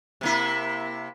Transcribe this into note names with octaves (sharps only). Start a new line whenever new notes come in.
C3 A#3 E4